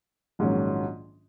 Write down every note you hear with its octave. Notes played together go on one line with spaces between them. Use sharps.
A#1 G#2 D#3 F#3 C#4